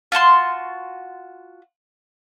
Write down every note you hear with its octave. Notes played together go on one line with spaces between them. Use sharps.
F4 F#4 A5 C6